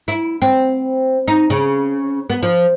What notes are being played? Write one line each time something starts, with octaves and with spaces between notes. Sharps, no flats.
E4
C4
D#4
C#3
B3
F3